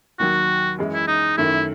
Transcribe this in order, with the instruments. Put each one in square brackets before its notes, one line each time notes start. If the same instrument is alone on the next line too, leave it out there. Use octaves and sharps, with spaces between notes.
[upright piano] D#2 D#3 F#3 [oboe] F#4
[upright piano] F#2 E3 G#3
[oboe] E4
D#4
[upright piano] F#2 D#3 A3 [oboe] E4